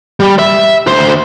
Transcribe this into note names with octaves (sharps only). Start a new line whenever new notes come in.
G3
E5
D2 C5